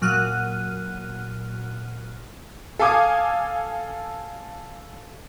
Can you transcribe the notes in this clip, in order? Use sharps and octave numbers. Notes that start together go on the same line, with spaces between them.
A#2 F#3 F6 F#6 D#7
A4 F5 G#5 D6 D#6 G#6